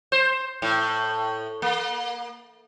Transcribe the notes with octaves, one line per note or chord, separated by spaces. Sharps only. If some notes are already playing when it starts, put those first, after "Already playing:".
C5
A2
A#3